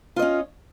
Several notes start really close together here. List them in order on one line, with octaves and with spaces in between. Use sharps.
F4 D#5 C#4